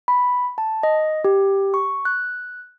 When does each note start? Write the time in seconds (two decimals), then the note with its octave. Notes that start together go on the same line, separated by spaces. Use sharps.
0.08 B5
0.58 A5
0.83 D#5
1.24 G4
1.74 C#6
2.05 F#6